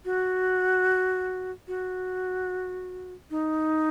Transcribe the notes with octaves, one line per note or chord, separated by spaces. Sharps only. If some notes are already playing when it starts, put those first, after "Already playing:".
F#4
F#4
D#4